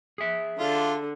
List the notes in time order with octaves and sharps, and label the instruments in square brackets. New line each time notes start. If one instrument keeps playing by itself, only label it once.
[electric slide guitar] G#4 E5
[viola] D3 [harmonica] D4 F4